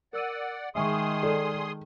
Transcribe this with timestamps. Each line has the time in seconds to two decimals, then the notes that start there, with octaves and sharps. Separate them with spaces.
0.13 A#4 D5 F#5 E6 D#7
0.75 D#3 G#3 G#4 E5 G#5 C6 C#6 D#6
1.23 A4 D5